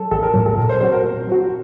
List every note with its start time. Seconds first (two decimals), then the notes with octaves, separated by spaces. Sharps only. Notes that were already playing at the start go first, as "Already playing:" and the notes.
Already playing: F#3 A4
0.11 A1 A4
0.23 A#4
0.34 A2 F#3 A#4
0.46 A4
0.58 A#2 A#4
0.69 C5
0.80 F#3 C4 F#4 C5
0.92 A#4
1.03 A#2
1.27 F#3 C4 F#4